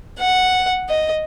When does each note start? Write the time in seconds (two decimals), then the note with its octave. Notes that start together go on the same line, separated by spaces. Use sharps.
0.19 F#5
0.89 D#5